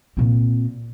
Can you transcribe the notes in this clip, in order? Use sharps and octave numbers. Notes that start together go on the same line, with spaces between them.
A#2 C4